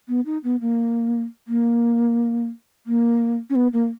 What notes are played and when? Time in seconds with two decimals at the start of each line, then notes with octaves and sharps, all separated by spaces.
0.08 B3
0.26 D#4
0.44 B3
0.61 A#3
1.48 A#3
2.86 A#3
3.50 C#4
3.55 B3
3.73 A#3